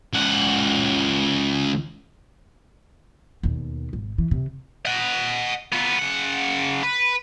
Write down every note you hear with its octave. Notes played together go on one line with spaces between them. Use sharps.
C#2 F#5
D#2 B2
G#1
E3
C3
D#5 F#5
B3 F4
C#3 F#5
B4